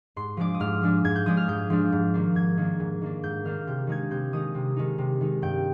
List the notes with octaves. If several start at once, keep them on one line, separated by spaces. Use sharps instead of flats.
G#2 C6
F3 G#3 D4 D6
D#6
G#2 F6
F3 G#3 D4
G#2 G#6
G6
F3 G#3 D4 D#6
F6
G#2 G6
F3 G#3 D4
G#2
D#3 A#3 D4
G#2 G#6
D#3 A#3 D4
G#2
D#3 A#3 D4
G#2 G6
D#3 A#3 D4 F6
C3 G6
D#3 G#3 D#4 G#6
C3 G6
D#3 G#3 D#4 D#6
C3
D#3 G#3 D#4
C3
D#3 G#3 D#4
G2 G5